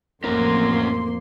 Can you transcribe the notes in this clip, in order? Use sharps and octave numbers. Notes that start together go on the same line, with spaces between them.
A1 F2 A#3 C#4 A#4 C6